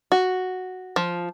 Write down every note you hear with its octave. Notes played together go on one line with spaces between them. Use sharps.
F#4
F3